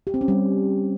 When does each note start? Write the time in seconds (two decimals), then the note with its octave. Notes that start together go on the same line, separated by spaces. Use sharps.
0.07 G4
0.14 C4
0.21 C#4
0.28 G3